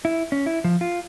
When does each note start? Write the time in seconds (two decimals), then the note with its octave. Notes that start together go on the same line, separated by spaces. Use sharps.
0.05 E4
0.32 C#4
0.46 E4
0.64 F3
0.81 F4